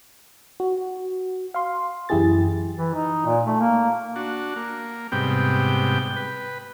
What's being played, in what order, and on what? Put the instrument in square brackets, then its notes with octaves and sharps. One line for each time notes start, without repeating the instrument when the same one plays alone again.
[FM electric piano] F#4
F5 C6
F#2 E3 E4 G4 G#4 A6
[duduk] E3
D#4
A#2
A3
A#3
[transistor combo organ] D4 F#4
A#3
G#2 C3 G3 B3 G5
B4